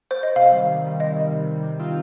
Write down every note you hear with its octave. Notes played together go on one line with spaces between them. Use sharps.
C5
D#5
C3 F5
D#3 G3
C3
D#3 G3
C3 D#5
D#3 G3
C3
D#3 G3
C3
D#3 C4 F4